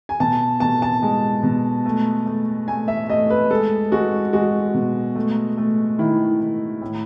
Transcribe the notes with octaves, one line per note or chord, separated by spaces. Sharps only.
G#5
B2 A5
B2 A5
A5
G#3
B2
A3
A3
A3 G#5
E5
A3 D#5
B4
G#3 A4
G#3 F#4
G#3 F#4
B2
A3
A3
D#3 E4
D#3
A2